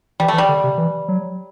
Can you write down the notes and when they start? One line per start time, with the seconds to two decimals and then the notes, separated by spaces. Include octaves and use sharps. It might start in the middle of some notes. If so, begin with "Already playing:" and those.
0.20 E3 G3
0.28 A3
0.33 E3
0.38 G3
0.49 D3
0.64 C3
0.78 E3
1.08 F#3